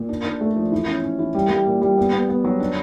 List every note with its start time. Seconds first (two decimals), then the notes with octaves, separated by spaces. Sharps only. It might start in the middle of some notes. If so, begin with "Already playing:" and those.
Already playing: A#2
0.09 D4
0.25 D4
0.41 A3
0.56 F3
0.72 E3
0.88 C#4
1.03 C#4
1.19 E3
1.35 G3
1.50 G3
1.67 A#2
1.82 G3
1.97 B3
2.13 B3
2.29 B3
2.44 F#3
2.60 D4